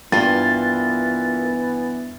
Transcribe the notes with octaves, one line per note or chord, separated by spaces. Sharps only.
G2 E3 A#3 B3 F4 A6